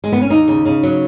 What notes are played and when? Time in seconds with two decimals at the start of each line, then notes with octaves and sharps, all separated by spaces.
0.04 G#3
0.12 B3
0.21 C#4
0.30 D#2 D#4
0.48 C#3
0.65 C#3
0.83 F#3